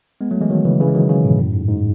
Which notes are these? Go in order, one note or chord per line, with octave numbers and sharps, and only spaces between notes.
G#3 B3
F#3 A3
E3 G#3
D#3 F#3
C#3 E3
C#3 E3
G#3
D#3 F#3
C#3 E3
G#2 B2
F#2 A2
G#2
G#2